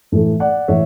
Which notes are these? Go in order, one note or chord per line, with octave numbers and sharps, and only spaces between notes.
A2 E3 A3
D5 F#5
A2 E3 C#5 E5